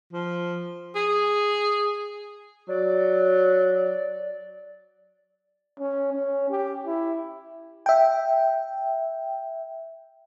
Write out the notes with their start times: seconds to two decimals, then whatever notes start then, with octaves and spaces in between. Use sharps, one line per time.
0.13 F3
0.95 G#4
2.68 F#3 D5
5.79 C#4
6.13 C#4
6.50 G4
6.86 E4
7.86 E5 G5